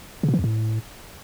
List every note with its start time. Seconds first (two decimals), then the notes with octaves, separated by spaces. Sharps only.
0.23 C#3
0.29 B2
0.34 E3
0.39 E2
0.44 A2